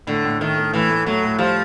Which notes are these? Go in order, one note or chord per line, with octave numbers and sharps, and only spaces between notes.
A2 D3
A2
D#3 A3
A3
A2 E3
A3
F#3 A3
A2
F3 G3